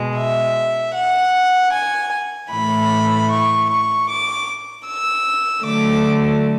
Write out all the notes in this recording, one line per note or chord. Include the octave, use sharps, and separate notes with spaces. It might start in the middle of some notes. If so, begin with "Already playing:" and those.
Already playing: B2 G#3
E5
F#5
G#5
A2 E3 A3 B5
C#6
C#6
D6
E6
D3 F#3 A3 D6